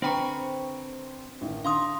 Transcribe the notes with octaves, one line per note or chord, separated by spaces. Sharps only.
D3 C4 B4 C5 G5 A#5 B5 C#6
A1 D#3
D3 F5 C6 D#6